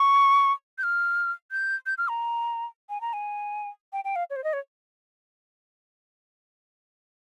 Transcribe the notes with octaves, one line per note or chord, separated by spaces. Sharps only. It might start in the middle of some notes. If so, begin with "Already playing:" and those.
Already playing: C#6
G6
F6
G6
G6
F6
A#5
G#5
A#5
G#5
G5
G5
F5
C#5
C5
D#5
C#5